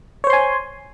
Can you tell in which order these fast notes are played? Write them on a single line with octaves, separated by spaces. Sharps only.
C#5 C5 C6 G#5